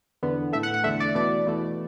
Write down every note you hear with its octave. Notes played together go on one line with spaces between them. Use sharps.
E2 D3 B3
A2 A3 E5
F#5
F#5
E2 D3 A3 E5
D5
E2 B2 A3 D5
E2 B2 A3